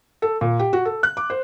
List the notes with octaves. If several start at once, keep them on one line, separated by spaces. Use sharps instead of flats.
A4
A#2
G4
F#4
A4
F#6
D6
C5